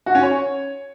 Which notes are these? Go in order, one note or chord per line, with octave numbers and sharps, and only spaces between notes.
F#4
C#4
C#5